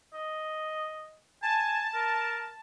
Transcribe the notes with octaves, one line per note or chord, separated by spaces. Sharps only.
D#5
G#5 A5
A#4